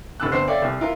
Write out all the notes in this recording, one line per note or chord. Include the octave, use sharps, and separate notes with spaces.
F1 A4 A5 E6 F#6
G1 C5 C7
A4 C#5 D5 E5 F5 G5
C2
E4 F4 A#4